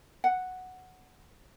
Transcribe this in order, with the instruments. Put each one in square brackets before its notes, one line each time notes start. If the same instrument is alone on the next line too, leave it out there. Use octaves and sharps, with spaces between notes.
[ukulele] F#5